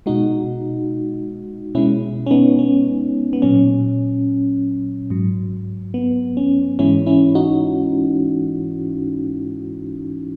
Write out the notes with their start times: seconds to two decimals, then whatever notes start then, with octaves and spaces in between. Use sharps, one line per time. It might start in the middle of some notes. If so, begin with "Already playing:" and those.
0.06 B2 G#3 D#4 F#4
1.75 B2 G#3 C#4 E4
2.27 C#4
2.31 B3 D#4
2.59 C#4
3.33 B3
3.42 A#2 F#3 C#4
5.10 G#2 F#3
5.94 B3
6.37 C#4
6.79 G#2 E3 G#3 C#4 E4
7.07 C#4 E4
7.35 D#4 F#4